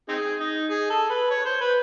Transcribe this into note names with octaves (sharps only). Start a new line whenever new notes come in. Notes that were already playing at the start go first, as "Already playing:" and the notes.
C4 D#4 G#4
D#4
G#4
A4
B4
C#5
C5
B4